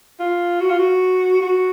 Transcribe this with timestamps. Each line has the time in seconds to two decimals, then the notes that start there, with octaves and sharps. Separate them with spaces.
0.20 F4
0.60 F#4
0.69 F4
0.79 F#4
1.41 F#4